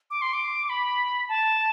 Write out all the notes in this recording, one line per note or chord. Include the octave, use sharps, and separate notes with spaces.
D6
C6
D6
B5
A5